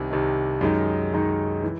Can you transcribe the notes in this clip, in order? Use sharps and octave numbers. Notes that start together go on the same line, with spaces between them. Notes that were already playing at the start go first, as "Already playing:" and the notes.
Already playing: C2 C3 D#3
C2 C3 D#3
F#2 D#3 G#3 D#4
F#2 D#3 G#3 D#4
E3